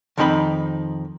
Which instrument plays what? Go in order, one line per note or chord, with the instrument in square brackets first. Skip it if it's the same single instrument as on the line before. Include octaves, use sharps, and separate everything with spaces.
[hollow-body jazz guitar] F2 D#3 C4 D#4 G5 B5